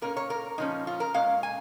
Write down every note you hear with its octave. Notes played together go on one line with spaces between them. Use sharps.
A#2 A#3 C#4 A#4
C#5
A#4
A#2 F3 C#4 D#4
F4
A#4
A#2 G#3 C#4 F5
G#5